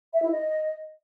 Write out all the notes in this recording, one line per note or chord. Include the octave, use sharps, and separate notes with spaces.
E5
E4
D#5